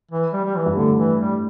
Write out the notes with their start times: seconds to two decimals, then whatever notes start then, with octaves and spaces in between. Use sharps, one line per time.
0.11 E3
0.33 G3
0.44 G3
0.55 E3
0.66 G2
0.76 A2 D3
0.98 E3
1.20 G3